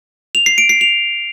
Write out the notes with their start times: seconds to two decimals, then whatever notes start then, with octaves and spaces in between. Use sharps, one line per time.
0.35 F7
0.46 C7
0.58 D7
0.69 C7
0.81 F7